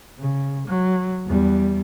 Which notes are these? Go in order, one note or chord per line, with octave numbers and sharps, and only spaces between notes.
C#3
F#3
E2 G3